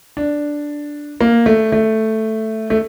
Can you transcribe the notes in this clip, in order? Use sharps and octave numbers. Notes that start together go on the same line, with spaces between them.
D4
A#3
A3
A3
A3